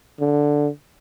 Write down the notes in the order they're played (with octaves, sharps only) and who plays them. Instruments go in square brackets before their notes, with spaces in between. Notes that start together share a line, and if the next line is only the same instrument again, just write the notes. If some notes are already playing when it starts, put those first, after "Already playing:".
[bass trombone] D3